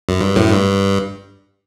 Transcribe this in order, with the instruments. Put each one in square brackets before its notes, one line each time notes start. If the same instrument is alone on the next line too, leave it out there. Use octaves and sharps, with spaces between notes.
[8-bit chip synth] F#2
G2
F#2 A2
G2